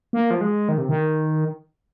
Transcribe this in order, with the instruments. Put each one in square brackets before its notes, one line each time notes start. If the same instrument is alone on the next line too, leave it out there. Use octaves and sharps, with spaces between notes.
[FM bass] A#3
F3
G#3
D#3
C3
D#3